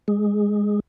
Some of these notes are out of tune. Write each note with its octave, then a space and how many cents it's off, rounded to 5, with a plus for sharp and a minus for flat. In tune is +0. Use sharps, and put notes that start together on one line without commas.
G#3 -10 G#4 +0